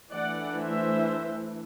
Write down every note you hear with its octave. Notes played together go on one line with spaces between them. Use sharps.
E3 A3 D4 D5 F#5
C5 E5